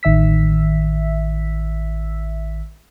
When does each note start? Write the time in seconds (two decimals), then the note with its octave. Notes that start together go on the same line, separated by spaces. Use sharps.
0.03 A1 D#3 E5 E6 B6